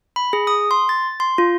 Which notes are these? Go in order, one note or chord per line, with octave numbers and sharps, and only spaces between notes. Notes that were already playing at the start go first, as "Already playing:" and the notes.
B5
G#4
D#6
C6
A6
C6
F4